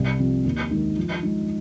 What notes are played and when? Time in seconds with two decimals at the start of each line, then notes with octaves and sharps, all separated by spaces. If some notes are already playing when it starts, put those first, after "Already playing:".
Already playing: C2
0.19 C3 F3
0.44 D#2
0.71 D#3 G#3 D#4
0.97 F3
1.23 G#3 D#4